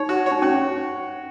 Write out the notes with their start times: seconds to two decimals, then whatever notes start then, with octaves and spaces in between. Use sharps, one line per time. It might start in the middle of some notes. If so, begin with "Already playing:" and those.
Already playing: D#4 C#5
0.09 F#4
0.26 C#5
0.32 D#4
0.42 C#4 F#4